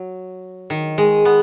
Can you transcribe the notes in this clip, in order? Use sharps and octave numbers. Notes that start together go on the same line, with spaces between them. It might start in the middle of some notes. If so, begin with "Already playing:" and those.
Already playing: F#3
D#3
G#3
B3